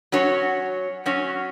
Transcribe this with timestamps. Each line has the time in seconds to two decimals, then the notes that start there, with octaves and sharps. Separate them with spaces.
0.12 F#3 C#4 F#4 C#5
1.06 F#3 C#4 F#4 C#5